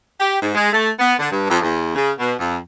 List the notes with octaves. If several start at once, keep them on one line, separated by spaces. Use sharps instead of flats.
G4
G#2
G#3
A3
B3
D3
G2
F2
E2
C#3
B2
F2